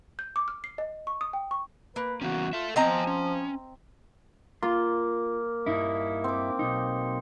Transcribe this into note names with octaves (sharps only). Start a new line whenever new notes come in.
G6
D6
F6
C7
D#5
C#6
D#6
G5
C#6
A#3 B4
E3 B3 C#4 F#4
F4 A4 E5
F3 B3 C4 D#5 G#5 A#5
C#4
A#3 F4 C6
G2 D#4 E4
C4 D6
B1 D#4